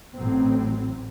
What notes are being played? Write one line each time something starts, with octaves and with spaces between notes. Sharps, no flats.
A1 A2 F#3 C4